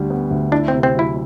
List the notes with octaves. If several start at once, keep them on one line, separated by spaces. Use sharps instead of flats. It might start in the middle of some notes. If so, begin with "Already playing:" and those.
Already playing: D2 D3 G3
B3
D2
D4 E4
C4
C3
C4
F#3 E4